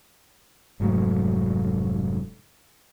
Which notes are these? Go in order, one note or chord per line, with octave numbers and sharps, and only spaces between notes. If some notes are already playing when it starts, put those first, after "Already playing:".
F1 G#2 F#3 A3